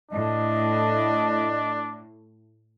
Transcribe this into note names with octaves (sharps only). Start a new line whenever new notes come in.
A2 D4 D#5